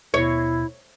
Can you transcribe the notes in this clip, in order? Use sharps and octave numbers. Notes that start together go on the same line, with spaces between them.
D#2 B2 E4 C#5